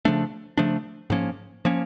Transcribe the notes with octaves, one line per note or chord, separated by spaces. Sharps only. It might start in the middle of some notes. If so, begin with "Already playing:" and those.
C#3 F3 A3 D4
C#3 F3 A3 D4
G#2 F3 A#3 C#4
F3 A#3 C#4